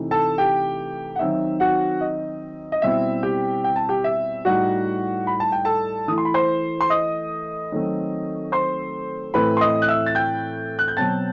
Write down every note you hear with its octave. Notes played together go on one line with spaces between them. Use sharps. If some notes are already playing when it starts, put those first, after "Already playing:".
Already playing: C3 E3 A3 D#4
A4 A5
G4 G5
F#5
D#3 F#3 C4 D#4 E5
F#4 F#5
D#5
D#5
B2 G3 C4 E4 E5
G4 G5
G5
A5
G4 G5
E5
A2 G3 D#4 F#4 F#5
B5
A5
G5
A4 A5
E3 A3 E4 D#6
C6
B5
C5 C6
C6
D#5 D#6
D#3 F#3 A3 C4
C5 C6
A2 E3 A3 C4 E4 B4 B5
C6
D#5 D#6
F#6
E5 E6
A6
G5 G6
F#6
G6
B2 F#3 C4 A5 A6